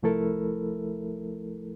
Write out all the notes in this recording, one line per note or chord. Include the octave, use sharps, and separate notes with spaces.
C2 F3 A3 E4 A4 A#4